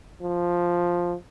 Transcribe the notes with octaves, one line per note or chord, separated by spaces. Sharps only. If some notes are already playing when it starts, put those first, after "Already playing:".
F3